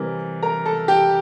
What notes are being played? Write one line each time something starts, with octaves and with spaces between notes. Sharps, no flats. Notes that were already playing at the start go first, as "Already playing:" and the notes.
Already playing: C3 E3 G3 A#4
A#4 A#5
A4 A5
G4 G5